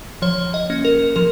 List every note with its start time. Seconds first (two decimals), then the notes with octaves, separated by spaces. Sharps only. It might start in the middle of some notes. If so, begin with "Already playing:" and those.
0.22 F3 C#5
0.54 D#5
0.70 A#3 C#4
0.85 A#4
1.16 F3 A#4